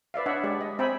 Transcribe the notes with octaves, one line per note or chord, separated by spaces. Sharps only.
B4 D5 E5 F5
D4 C#5 D#5 E5 F#5
G#3 G4 D5
D#5
C4 E5 G5 G#5 B5